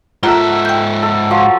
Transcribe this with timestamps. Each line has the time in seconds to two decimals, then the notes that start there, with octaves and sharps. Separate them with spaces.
0.23 G#2 F4 A4 A#4 E5 F#5 A#5
0.65 G5 G6
1.03 A4
1.30 F3 F#3